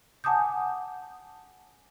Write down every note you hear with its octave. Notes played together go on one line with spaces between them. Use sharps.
F#5 G#5 A5 D6 D#6 G6